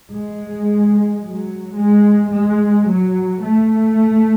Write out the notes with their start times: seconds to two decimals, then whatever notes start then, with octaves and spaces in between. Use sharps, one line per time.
0.13 G#3
1.22 F#3
1.77 G#3
2.32 G#3
2.88 F#3
3.43 A3